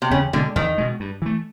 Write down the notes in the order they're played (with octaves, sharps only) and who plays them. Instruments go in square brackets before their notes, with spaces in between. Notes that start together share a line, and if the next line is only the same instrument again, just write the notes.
[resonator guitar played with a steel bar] C3
[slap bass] E2 [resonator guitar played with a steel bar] C#3
[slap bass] B2 G#3 [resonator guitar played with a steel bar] D3
[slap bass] E2 [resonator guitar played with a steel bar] D#3
[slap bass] B2 G#3
G2
E3 A3